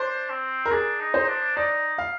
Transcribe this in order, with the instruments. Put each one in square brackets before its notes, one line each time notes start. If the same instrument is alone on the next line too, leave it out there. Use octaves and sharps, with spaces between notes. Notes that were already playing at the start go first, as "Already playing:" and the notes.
Already playing: [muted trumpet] D4 [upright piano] C5
[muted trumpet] C4
[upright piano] A#4
[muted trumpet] D4 [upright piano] G#4
[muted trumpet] D#4
[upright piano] C5
[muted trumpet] D4
[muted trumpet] D#4 [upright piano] D5
[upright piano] F5